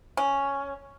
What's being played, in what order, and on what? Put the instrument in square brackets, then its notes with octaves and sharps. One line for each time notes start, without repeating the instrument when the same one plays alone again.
[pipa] C#4